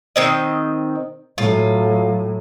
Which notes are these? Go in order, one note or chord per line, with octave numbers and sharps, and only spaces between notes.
D#3 C4 D#5
A2 F#3 F4